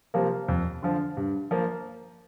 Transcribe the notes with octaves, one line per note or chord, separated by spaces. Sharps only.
C3 F3 A#3
F2
D3 F3
G2
F3 A#3